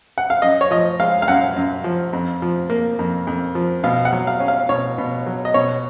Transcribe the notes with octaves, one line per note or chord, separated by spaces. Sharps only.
F#5
F5
F#2 D#5
C#5
F3 D#5
G#3 F5
F5
F#2 F#5
F#2
F3
F2
F3
A#3
F2
F2
F3
B2 F5
F#5
F#3
F5
C#4
F5
B2 C#5
B2
F#3
D#5
B2 C#5